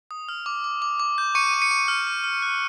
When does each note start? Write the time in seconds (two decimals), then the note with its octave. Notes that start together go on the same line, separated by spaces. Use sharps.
0.11 D#6
0.29 F6
0.46 D6
0.64 D6
0.82 D6
1.00 D6
1.18 G6
1.35 C#6 C#7 D#7
1.54 C#6
1.62 C#7 D#7
1.71 C#6
1.88 F6
2.07 F6
2.24 F6
2.42 F#6